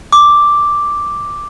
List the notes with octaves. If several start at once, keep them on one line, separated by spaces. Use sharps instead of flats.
D6